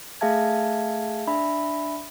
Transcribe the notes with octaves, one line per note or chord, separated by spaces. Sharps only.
A3 G#4 E5 F5 A5 G#6
D4 E5 B5